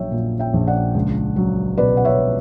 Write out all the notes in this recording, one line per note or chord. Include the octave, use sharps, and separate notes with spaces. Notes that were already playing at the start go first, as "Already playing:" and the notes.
Already playing: A#1 F#3 C#5 E5 G5
A#2
E5 G5
A#1
D5 F#5
C#2
F#3
B2 B4 D5
F#5
C#5 E5